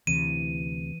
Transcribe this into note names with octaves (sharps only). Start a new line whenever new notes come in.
D2 C3 E3 D#7